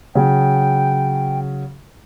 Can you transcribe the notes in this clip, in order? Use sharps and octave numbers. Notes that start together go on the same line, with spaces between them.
C#3 F#3 G5